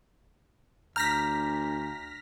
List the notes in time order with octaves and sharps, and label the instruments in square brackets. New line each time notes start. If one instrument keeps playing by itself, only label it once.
[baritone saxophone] D2 [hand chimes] A#5 G6 [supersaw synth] F6 A#6 B6